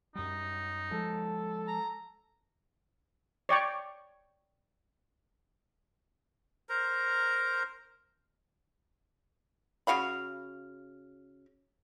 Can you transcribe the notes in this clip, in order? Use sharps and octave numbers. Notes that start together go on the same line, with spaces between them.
F#2 G3 D#4
F3 G#3 A4
A#5
C#5 D5 G5 C#6
A#4 C5 A#5
C#3 F#4 F5 B5